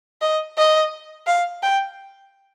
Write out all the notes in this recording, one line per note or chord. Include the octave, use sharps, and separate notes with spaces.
D#5
D#5
F5
G5